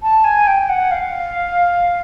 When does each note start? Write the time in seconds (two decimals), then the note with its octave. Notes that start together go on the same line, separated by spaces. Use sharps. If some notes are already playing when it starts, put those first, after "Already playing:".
0.03 A5
0.24 G#5
0.47 G5
0.69 F#5
0.91 F5